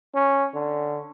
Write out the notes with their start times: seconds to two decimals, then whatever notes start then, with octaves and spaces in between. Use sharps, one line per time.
0.15 C#4
0.54 D3